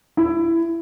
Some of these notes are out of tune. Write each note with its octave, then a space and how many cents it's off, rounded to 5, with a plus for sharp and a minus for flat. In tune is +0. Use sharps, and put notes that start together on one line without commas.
E4 +15